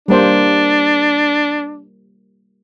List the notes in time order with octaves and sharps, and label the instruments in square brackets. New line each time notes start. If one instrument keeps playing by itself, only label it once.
[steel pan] G3 A#3 C5 [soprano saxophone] D4